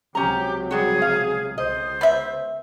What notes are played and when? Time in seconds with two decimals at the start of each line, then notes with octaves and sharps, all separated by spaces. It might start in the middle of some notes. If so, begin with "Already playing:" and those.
0.15 C#2 C3 F#3 C#4 G4 A#5
0.71 G3 F#4 G#4
1.02 F5
1.58 C#2 C5 D#5
2.01 B3 E5